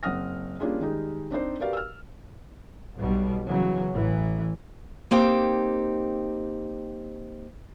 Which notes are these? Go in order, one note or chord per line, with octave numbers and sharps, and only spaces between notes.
F#1 C4 F#5 D#6 F6 A#6
G3 A#3 C#4 D4 F4 G#4
D#3 G3 G#3 D#4 G4
C4 D4 D#4 C5 D5
F#4 G4 A#4 B4 D5 F5
E6 F6
B1 B2 G3
C#3 E3 F#3
A1 E3
A#3 C4 D#4 G4